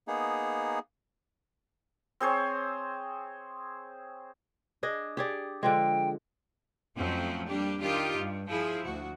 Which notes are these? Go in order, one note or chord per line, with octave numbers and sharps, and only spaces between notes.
A#3 B3 D#4 G#4
C4 G#4 C5 C#5
D4 G#4 D#5
G4 G#4 D5
D3 F3 G#3 G5
F2 F3 F#3 A3 C4 C#4
G3 A#3 D4 G4
D#3 D4 D#4 F4 G4
G2
F3 E4 G#4
D2 F#4